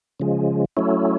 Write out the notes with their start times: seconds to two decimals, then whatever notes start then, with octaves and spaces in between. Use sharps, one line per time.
0.20 C#3 F3 G#3
0.77 F#3 A3 C#4 E4